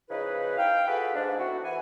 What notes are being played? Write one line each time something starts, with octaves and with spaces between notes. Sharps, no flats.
C#3 F3 D#4 E4 G#4 B4
F5 G5
F4 F#4 G#4 A4 B4
G#2 D4
A3 B3 C4 E4 F#4
E3 B4 F#5 G#5